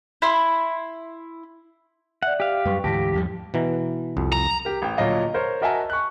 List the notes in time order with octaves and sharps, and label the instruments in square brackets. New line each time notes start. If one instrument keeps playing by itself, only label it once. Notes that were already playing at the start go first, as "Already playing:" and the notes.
[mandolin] E4 C6
[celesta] D5 E5 [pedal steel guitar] F#5
[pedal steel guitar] G4 F5
[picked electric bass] F#2 G3 [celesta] B4 G5 C#6
[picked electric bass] D2 G#2 E3 [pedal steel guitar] G4 [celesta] A5 A#6 B6
[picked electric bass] E2 F3 G3
[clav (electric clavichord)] B2 E3 A#5
C2 F2
[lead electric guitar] A#5
[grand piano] G4 A#4
A1 G5
D1 A#1 A#2 F#3 D#5 F5
A#4 C5 C#5
F#4 A#4 D#5 E5 G#5 A5
C#6 F#6